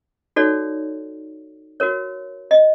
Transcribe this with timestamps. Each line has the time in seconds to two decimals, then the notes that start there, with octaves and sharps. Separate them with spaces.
0.36 D#4 F#4 A4 C#5 D5
1.80 F#4 A#4 C#5
2.51 D#5